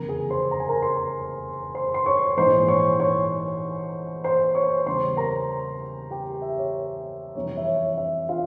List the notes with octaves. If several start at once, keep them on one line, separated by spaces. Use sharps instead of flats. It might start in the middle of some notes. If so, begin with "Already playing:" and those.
Already playing: F1 E2 C#3 A#4 A#5
G#4 G#5
C5 C6
A#5
G#5
A#4 A#5
C5 C6
C5 C6
C6
C#5 C#6
A#1 G#2 E3 C5 C6
C#5 C#6
C#5 C#6
C5 C6
C#5 C#6
E2 C#3 G3 C5 C6
A#4 A#5
G4 G5
E5
C#5
F2 C3 E3 G3 C#5
E5
C#5
E5
F4 F5